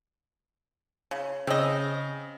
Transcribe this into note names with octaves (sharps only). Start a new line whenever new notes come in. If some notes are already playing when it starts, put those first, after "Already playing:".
C#3
C#3 C4 D#5